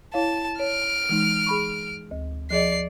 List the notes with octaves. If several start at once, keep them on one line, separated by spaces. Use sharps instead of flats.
E4 C#5 F5 A5
C#5 F6 D7
E3 G#3 D#4
G#4 B5 C#6
D2
F3 G#4 D5 D#5 C7